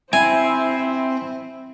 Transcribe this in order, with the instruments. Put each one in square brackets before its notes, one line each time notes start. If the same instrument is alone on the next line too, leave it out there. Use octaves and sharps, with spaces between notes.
[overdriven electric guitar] C4 [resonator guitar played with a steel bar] E4 [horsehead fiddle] C5 E5 [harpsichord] G#5